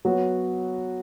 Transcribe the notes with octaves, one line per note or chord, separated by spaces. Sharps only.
F#3 B3 F#4